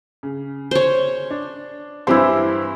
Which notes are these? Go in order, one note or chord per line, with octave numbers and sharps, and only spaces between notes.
C#3
C5 C#5
D4
G2 E3 G3 C4 E4 G4 C6